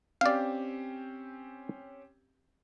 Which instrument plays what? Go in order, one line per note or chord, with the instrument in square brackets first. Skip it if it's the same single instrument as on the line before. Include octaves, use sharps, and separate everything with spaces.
[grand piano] C4 C#4 G4 [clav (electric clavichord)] D5 F5